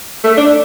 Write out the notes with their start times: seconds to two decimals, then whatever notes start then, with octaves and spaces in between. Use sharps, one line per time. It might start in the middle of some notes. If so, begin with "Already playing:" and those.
0.24 A3
0.37 D4